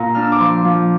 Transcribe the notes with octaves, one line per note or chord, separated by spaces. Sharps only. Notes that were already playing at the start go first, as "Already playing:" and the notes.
Already playing: A#2 A#5
D4 F6
E6
D6
F3 C6
F3